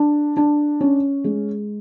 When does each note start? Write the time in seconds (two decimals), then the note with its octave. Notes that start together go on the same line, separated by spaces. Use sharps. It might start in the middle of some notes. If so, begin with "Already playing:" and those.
Already playing: D4
0.37 D4
0.81 C#4
1.24 G#3